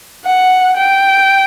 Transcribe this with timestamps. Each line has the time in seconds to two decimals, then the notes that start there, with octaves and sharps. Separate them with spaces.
0.25 F#5
0.76 G5